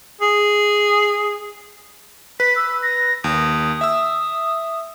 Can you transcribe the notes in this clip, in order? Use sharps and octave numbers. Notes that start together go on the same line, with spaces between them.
G#4
B4 B6
E6
A#6
D#2 D#6
E5 E6